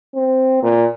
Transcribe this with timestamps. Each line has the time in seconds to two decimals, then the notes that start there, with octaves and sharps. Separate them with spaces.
0.15 C4
0.63 A#2